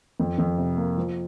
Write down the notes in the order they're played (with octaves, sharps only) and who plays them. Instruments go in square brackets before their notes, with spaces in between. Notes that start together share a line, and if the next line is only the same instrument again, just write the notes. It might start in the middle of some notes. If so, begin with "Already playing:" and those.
[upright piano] F2
F2
C3
A#3
F3